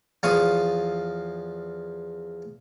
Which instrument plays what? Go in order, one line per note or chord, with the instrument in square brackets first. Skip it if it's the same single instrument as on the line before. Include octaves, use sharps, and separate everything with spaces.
[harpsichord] E2 F3 F5 C#6 D#6